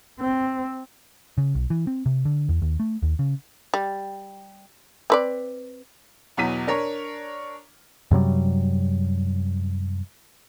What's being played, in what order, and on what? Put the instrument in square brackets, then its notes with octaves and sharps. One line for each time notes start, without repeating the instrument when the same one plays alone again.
[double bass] C4
[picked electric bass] C#3
B1
E3
C4
C3
D3
E2
D#2
A3
D#2
C#3
[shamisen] G3
C4 B4 D5
[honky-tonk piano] E2 B2 F#3 B6 D#7
D4 A#4 C#5
[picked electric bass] F#2 C3 F#3 G3